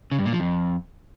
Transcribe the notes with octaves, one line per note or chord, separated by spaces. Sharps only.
C#3
G2
A#2
F3
F2